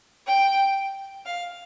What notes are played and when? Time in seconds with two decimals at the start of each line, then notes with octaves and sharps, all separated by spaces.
0.27 G5
1.26 F5